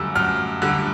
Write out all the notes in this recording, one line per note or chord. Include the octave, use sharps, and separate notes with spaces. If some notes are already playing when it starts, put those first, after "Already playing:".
Already playing: F#2 D3 G3 E6
F#2 F6
D3 G3